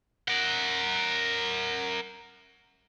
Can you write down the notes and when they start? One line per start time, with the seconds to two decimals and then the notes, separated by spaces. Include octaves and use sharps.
0.28 A#4 F#5